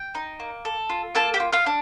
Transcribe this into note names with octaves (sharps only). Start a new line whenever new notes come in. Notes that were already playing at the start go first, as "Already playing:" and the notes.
Already playing: G5
D#4
A#3
A4
F4
A#3 A4 A5
G4 G5
F4
F4 F5
D4